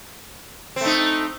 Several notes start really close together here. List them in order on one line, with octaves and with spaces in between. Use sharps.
C4 A3 D#4